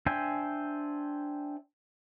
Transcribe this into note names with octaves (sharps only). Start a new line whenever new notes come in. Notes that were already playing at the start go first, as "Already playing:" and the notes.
D4 C5 E5 G5 G#5